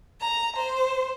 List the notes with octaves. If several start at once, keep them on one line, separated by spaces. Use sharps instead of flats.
A#5
C5